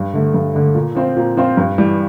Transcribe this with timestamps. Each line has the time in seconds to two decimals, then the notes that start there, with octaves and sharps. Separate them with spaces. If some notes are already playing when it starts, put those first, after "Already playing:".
Already playing: G2
0.13 D3 A3
0.34 G2
0.54 D3 A3
0.75 A#2
0.95 F3 C4 F4 C5
1.17 A#2
1.37 F3 C4 F4 C5
1.57 G2
1.78 E3 G3